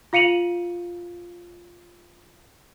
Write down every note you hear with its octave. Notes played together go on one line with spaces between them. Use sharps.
F4 F5 C#7 D#7 F7 F#7